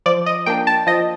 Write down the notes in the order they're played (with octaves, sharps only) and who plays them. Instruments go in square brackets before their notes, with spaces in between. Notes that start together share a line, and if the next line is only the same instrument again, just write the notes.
[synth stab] F3 D5
D#5
A#3 D4 G5
A5
F3 D#5